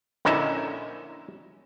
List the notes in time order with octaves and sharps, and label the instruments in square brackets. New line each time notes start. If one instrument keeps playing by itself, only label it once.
[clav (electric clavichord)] A#1 D3 C#4 D#4 E4 E5